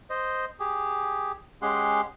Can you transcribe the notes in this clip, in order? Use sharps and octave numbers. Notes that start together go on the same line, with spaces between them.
C5 D#5
G4 G#4
G#3 C#4 G4 G#4 F#5 C6